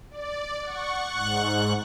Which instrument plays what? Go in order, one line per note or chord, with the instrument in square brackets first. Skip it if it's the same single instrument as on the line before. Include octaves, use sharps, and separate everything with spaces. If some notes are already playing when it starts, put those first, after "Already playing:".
[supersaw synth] D5
F#5 C#6
[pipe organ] G#2 F#6